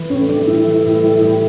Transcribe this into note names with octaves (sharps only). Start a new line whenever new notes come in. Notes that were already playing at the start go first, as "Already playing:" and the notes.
Already playing: E3
A2 C#4
G3 D4
A2 E4
E3
A2
G3
A2